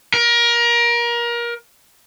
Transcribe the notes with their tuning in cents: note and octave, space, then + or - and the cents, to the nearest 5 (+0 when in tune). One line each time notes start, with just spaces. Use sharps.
A#4 +25